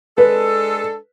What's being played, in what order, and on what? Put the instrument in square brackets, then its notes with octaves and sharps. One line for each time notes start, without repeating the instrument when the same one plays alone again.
[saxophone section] G#3 D4 A4 [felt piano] B4